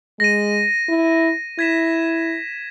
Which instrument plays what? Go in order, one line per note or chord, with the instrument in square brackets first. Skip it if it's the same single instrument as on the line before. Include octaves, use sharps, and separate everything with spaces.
[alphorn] G#3 [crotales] A#6 D#7
[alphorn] E4
[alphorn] E4 [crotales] G#6 B6 E7